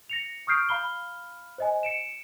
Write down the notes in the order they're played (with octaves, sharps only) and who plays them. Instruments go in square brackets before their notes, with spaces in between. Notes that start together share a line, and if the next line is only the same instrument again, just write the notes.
[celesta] A#6 C#7 F7
C#6 D#6 F6 G6 C7 D7
F5 A#5 B5 F6 G7
C5 D#5 G#5
C#7 D7 E7